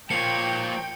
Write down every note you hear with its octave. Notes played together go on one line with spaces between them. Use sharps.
F3 A#3 F4 C#5 G5 C#7